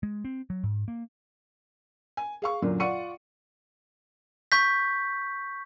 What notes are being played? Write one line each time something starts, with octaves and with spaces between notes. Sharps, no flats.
G#3
C4
F#3
G#2
A#3
G#5
G#4 F5 C#6
F#2 A#2 D3 F#3
F4 D5 F#5 C#6 C#7 D#7
C#6 G6 B6